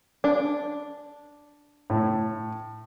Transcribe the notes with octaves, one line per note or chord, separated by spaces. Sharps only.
D4
A2